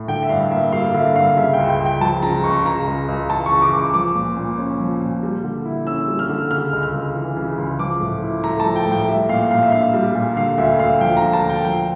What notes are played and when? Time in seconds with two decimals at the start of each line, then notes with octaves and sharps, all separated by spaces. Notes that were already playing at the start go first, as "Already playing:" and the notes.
Already playing: A2
0.08 D3 G5
0.23 E5
0.29 G2 F5
0.51 A#3 E5
0.72 G3 F5
0.94 D3 E5
1.15 G2 F5
1.37 C#3 E5
1.53 C#2 G5
1.69 G5
1.80 C#2
1.86 G5
2.01 F3 A5
2.23 C#3 A#5
2.44 C#2 C#6
2.66 C#3 A#5
2.87 C#2
3.08 C#2
3.30 E3 A5
3.46 C#6
3.52 C#3
3.62 D6
3.73 C#2
3.78 D6
3.94 F3 D6
4.15 A#2
4.37 A#2
4.58 C#4
4.80 F3
5.01 A#2
5.23 G3
5.44 D3
5.65 E4
5.87 C#4 E6
6.08 G3
6.19 F6
6.29 D3
6.51 C#3 F6
6.73 C#2
6.83 F6
6.94 C#2
7.15 E3
7.37 C#3
7.58 C#2
7.79 F3 D6
8.01 A2
8.23 E4
8.44 A3 A#5
8.60 A5
8.65 F3
8.76 G5
8.87 A2 G5
9.08 G3 E5
9.29 A#2 F5
9.51 A#2 F5
9.63 E5
9.72 D4 F5
9.94 G3
10.15 A#2
10.37 D3 F5
10.58 D2 E5
10.79 D2 F5
11.01 F3 G5
11.17 A#5
11.22 D3
11.33 A5
11.44 D2
11.49 G5
11.65 F3 G5